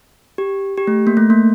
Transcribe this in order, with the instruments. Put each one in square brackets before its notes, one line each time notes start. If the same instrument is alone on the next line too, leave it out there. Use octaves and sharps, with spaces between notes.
[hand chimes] G4
G4
A3
A#3
A3
A#3